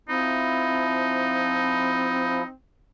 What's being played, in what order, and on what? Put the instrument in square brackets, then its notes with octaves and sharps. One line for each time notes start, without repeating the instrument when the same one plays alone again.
[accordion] F3 E4 [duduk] C4 [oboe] D#4